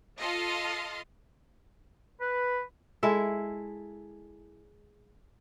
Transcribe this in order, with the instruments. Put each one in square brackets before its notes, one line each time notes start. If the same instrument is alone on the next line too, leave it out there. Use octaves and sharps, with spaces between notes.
[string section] F4 A4 D#5 F5 C6
[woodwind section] B4
[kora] G#3 E4 A4 E5